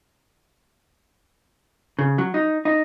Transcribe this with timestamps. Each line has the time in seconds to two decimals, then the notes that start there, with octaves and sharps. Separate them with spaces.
1.99 C#3
2.18 F#3
2.34 D#4
2.65 D#4